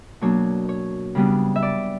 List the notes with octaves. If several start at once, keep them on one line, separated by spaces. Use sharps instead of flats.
B2 F#3 A#3 D4 C#5
C#5
C#3 G3 B3 D4
E5
D5